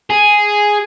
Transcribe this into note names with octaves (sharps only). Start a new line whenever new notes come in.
G#4